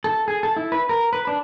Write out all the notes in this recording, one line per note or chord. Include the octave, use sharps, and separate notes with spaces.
A4
G#4
A4
E4
B4
A#4
B4
D4